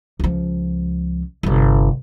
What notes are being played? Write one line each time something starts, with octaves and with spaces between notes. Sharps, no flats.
C#2 F3
G1 C3